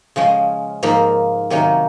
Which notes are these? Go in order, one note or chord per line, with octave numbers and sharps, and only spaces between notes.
C#3 F3 G#3 C#4
G#2 F3 A#3
C3 D#3 F#3 A#3 C#4